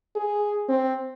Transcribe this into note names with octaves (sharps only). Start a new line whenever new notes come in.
G#4
C4